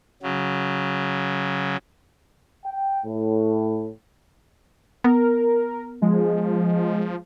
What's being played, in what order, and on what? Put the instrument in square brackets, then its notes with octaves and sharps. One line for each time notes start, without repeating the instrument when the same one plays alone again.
[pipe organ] C#3 F#3
[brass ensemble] G5
A2
[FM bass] B3 [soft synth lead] A#4
[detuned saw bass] F3 [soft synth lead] G#3